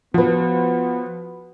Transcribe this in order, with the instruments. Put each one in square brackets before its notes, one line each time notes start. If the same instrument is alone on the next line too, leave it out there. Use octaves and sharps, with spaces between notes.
[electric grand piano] F3 [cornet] B3 [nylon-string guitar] F#4 B4